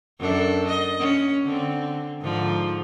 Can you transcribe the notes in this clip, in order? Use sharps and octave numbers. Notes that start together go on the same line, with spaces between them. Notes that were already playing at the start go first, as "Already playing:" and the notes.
F#2 D4 A4
D#5
C#4
D3 C4
G#2 D3 F3